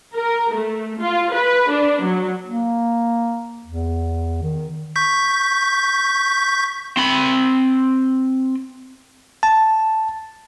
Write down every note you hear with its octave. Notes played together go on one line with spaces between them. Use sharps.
A#4
A3
F4
B4
D4
F#3
A#3
E2
D#3
C#6 G6 B6
C4 B5
A5